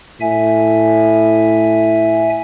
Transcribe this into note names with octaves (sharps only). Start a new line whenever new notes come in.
A2 E5 G#5